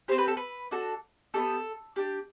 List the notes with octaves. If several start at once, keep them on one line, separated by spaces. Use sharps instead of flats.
C4 G4 C5
B4
A4
B4
D4 F#4 A4
B3 D4 G4 A4
D4 G4